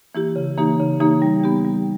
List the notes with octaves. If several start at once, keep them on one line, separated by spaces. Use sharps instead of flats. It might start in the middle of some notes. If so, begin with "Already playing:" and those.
E3 A#3 E4 G4
C#3
E3 A#3 D#4 G4
C#3
E3 A#3 D#4 G4
G3
B3 G4
G3